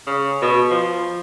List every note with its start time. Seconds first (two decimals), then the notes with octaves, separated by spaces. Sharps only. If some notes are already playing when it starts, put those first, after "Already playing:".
0.07 C#3
0.42 B2
0.70 F3